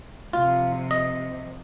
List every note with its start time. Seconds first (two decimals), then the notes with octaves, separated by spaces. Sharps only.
0.33 F2 C3 F4
0.91 D#5